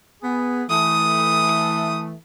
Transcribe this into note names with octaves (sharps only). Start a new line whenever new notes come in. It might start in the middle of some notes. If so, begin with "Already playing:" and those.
B3 G#4
E3 A3 D#6